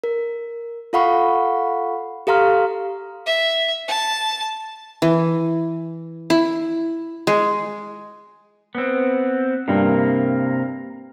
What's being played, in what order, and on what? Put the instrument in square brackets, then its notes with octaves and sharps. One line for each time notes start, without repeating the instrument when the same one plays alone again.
[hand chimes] A#4
F4 A4 F5 F#5 B5 C#6
G4 A4 F5 A#5 C6 F6
[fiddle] E5
A5
[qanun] E3
E4
G#3
[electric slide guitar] B3 C4
[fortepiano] G2 [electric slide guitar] C3 A#3